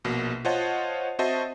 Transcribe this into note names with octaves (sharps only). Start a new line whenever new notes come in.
A#1 B2 A#3
F4 C5 C#5 D#5 F#5 A5
C4 F#4 C5 D#5 E5 A5